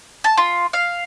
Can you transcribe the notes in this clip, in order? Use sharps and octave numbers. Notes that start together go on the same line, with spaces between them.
A5
F4
F5